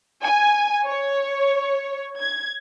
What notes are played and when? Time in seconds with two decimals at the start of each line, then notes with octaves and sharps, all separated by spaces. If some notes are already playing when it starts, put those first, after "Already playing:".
0.23 G#5
0.86 C#5
2.19 G#6